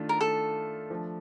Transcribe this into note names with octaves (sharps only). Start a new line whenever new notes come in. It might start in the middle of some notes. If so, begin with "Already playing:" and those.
Already playing: D#3 A3 D4 F4
A#4
A4
F3 A3 D4